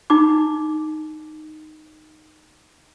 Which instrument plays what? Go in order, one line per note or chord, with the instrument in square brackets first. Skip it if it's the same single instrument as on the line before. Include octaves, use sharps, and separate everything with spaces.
[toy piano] D#4 E4 D6